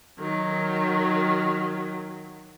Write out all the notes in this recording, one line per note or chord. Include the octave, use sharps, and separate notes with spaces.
D#3 F#3